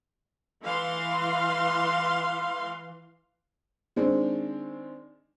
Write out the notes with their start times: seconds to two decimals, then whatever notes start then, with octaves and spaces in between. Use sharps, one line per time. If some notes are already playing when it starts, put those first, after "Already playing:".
0.63 E3 F5 C6
3.96 D#3 G#3 C4 D4